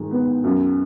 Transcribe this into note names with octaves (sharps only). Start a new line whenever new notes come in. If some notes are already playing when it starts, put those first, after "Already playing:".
Already playing: G#2 D#3 G#3
B3
F#2